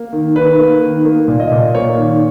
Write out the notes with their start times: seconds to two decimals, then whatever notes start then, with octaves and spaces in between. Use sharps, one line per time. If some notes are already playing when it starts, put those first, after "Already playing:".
Already playing: A#3
0.13 D#3
0.36 D#3 B4
0.59 A#3
0.82 D#3
1.05 A#3
1.28 A#2
1.40 D#5
1.52 A#2
1.75 A#3 C#5
1.98 D#3